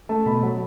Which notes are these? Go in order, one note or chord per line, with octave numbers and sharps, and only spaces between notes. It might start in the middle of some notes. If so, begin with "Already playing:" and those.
A3 A5
B2 B5
F#3